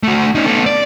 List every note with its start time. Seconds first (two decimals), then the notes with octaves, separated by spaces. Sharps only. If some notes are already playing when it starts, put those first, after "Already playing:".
0.03 A3 F#4
0.35 C#4 D#4
0.46 B3 A4
0.66 D5